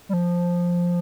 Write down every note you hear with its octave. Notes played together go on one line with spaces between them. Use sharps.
G3
F3